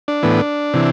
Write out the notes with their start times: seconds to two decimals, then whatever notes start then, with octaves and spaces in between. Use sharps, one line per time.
0.08 D4
0.23 A2 E3 B3
0.73 C3 E3